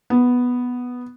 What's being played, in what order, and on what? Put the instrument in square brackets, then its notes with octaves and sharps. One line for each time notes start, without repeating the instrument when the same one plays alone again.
[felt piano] B3